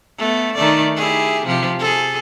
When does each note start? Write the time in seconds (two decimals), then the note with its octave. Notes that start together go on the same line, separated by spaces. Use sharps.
0.18 A3 B3
0.55 D#3 A3 D5
0.96 E4 G4 G#4
1.46 C3 F3 G4
1.79 G#4 A4